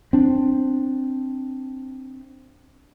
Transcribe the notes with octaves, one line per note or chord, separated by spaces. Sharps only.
C4 D4